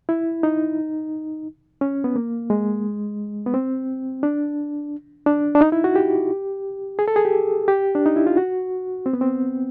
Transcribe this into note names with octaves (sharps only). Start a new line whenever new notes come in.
E4
D#4
C#4
B3
A#3
G#3
B3
C4
D4
D4
D4
D#4
E4
F#4
G4
G#4
A4
G#4
G4
G4
D4
D#4
E4
F4
F#4
C4
B3
C4